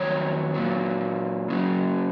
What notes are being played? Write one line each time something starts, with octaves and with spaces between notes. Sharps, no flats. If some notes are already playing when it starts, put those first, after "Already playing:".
Already playing: F2 D#3 F#3 C#5
A#2 F#3
F#2 C#3 F#3